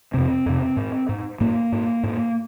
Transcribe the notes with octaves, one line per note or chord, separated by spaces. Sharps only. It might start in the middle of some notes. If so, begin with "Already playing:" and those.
F2 C3 C4
F2 C3
G#2
G#2
G#2 A#3
G#2
G#2